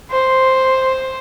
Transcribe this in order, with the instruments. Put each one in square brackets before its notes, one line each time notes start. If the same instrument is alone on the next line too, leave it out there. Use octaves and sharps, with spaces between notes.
[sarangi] C5